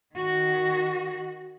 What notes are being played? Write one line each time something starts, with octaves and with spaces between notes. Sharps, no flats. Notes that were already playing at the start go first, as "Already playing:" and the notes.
D#3 F#4